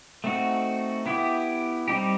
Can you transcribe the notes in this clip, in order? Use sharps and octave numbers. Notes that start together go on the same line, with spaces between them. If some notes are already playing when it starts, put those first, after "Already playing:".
A3 C4 D#4 F#4
B3 E4 G4
G3 C4 D#4 G4